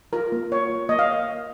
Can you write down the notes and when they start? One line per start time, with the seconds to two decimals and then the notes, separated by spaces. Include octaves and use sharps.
0.13 F4 A#4
0.32 A#3
0.52 F4 C#5
0.70 A#3
0.89 A#3 D#5
0.99 F5